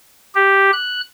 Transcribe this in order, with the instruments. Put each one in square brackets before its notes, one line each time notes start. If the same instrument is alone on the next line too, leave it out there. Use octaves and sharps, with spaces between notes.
[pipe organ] G4
F#6